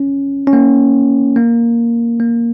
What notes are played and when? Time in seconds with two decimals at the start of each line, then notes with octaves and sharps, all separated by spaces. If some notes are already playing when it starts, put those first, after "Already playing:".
Already playing: C#4
0.47 C#4
0.53 A#3
1.36 A#3
2.20 A#3